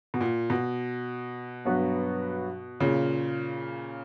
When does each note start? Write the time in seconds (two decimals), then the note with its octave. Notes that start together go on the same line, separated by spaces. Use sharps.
0.14 B2
0.21 A#2
0.50 B2
1.65 G2 F#3 B3 F#4 B4
2.80 A#2 C#3